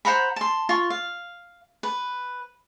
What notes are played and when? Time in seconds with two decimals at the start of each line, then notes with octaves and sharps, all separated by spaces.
0.05 C5 F#5 A#5 B5
0.36 A5 C6
0.69 F4 C#6
0.90 F5
1.83 B4